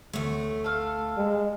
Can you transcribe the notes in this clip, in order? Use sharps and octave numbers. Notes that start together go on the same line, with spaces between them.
D2 A3 C#5
A4 F5
G#3